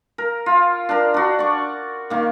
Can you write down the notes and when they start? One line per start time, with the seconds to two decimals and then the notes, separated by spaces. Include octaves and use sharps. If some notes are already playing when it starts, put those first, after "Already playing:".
0.18 A#4
0.46 F4
0.89 D4 A#4
1.14 D4 F#4
1.39 D5 C#6
2.10 D#3 A#3